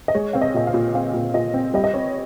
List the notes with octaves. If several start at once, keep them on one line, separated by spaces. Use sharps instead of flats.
D#5
G#3 C#5
C4 F5
D#5
A#2 D#5
F5
A#2
C4 F5
A#2
A#2 D#5
C4
G3 D#5
D#5
C4 C#5